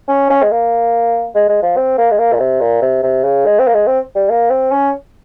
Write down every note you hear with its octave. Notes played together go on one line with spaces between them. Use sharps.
C#4
C#4
G#3
A#3
G#3
G#3
F3
C4
A#3
G#3
A#3
A#2
C3
A#2
C3
C3
C#3
G#3
C4
A#3
G#3
C4
G3
A#3
C4
C#4